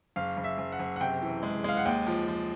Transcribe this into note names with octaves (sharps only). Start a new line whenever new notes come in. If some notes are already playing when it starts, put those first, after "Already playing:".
F#1 F5
F#1
E5
F#1
F#5
F#1
F#5
C3 G5
E3
G#3
G#3 F5
F#5
D#2 G5
F3
F3